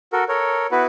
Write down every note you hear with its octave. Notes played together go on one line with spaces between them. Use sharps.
F#4 A4 A#4
A4 A#4 C#5
B3 E4 F#4 B4